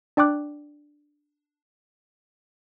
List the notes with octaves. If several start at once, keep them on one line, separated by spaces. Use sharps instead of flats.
D4 D5 G5 C#6 D6 F#6